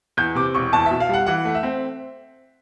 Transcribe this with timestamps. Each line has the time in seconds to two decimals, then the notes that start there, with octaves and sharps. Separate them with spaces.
0.17 E2 G6
0.35 C3 D6
0.54 E1 C#6
0.73 E2 A5
0.86 E5
0.91 B2
1.00 F5
1.09 G3 F#5
1.27 E3 F#5
1.45 A3
1.55 E5
1.63 C4